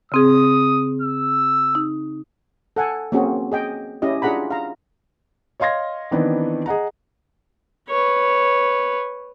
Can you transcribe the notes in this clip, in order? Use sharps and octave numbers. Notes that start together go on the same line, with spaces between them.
C#3 C4 G#4 D#6
E6
D#4
A4 F#5 G#5
A#3 C4 C#4 F#4 G#4
G#4 D#5 G5
C#4 E4 G4 D#5
D4 F4 G#4 F#5 A#5 B5
F5 A#5
C#5 D#5 F5 C6 G#6 A#6
D#3 E3 B3 C4 D4 D#4
G#4 D#5 F#5 A#5
B4 C#5